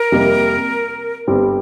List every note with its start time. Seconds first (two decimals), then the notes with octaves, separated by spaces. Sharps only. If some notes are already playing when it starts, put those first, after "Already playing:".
Already playing: A#4
0.12 F2 C3 G3 A#3
1.28 G1 G2 G3 C4